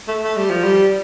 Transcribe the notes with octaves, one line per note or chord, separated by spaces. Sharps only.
A3
A3
G3
F3
G3